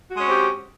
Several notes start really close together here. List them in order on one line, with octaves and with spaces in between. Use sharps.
F#4 G#3 C#4 C4 G4